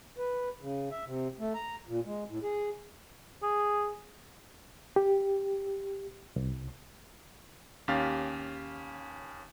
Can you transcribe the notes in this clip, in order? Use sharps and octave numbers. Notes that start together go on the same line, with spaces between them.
B4
C#3
E5
C3
A3
A#5
A#2
G#3
A2
G#4
G#4
G4
C2
D#2 C#4 G4 F5 A6